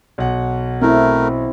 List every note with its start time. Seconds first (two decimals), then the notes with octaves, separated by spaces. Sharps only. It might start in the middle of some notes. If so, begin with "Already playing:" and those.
0.18 B1 F#5
0.82 A3 C4 E4 A#4